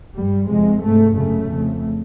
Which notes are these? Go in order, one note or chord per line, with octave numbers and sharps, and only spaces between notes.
G2 G3
F2 C3 G#3
G#2 A3
F#2 C#3 A3
F2 C#3